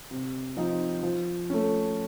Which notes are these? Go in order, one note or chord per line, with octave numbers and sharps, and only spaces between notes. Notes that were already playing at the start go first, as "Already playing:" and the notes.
C3
F3 C4 D#4
F3
A3 C#4